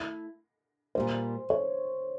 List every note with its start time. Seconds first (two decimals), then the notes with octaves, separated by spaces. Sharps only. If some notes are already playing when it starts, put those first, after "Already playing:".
Already playing: A3 E4
0.95 A#2 G3 A#3 C5
1.50 C#5